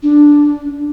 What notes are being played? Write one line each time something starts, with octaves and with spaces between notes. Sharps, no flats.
D4